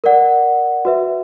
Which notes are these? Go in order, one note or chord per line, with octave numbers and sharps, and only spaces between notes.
A#4 D5 F#5
F#4 B4 E5